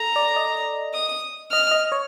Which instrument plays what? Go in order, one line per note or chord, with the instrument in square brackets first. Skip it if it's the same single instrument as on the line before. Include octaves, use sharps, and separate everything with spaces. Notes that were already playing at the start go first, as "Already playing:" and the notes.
Already playing: [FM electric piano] A4 [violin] A#5
[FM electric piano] D5
D#5
[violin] D#6
[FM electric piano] D#5 [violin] F6
[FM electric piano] D#5
C#5